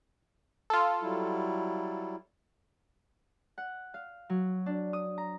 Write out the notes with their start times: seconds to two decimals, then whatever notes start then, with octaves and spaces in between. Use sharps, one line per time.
0.70 F4 A4
1.02 F#3 G3 E4
3.58 F#5
3.94 F5
4.30 F#3
4.66 D4
4.93 D#6
5.18 A#5